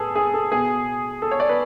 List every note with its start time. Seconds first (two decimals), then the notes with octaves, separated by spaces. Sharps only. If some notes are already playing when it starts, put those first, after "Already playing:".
Already playing: A2 G#4 A4 B4
0.16 G#4
0.34 A4
0.52 B2 G#4
1.22 A4
1.31 C#5
1.40 D5
1.49 B4